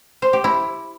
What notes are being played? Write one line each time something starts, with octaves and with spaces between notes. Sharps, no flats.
C5
G4
E4